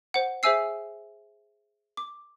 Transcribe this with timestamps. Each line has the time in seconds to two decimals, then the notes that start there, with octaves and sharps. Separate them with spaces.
0.14 C5 F#5
0.43 G#4 C5 E5 G#5 E6 C7
1.97 D6